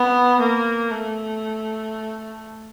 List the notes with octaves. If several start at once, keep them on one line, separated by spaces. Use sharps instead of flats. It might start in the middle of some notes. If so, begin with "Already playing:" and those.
Already playing: B3
A#3
A3